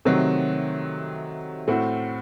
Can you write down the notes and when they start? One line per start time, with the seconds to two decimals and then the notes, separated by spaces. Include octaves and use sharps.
0.05 C3 D#3 F#3 A3 C4
1.68 A2 A3 C4 F#4